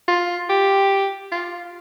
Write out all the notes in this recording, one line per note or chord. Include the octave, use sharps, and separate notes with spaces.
F4
G4
F4